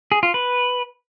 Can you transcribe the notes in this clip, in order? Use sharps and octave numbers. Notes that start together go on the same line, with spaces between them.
G#4
F4
B4